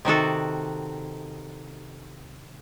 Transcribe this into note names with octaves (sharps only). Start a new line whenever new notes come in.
C3 D#3 F#4 A4